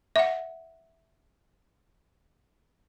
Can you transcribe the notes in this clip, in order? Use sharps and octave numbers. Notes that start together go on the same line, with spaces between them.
E5 F#5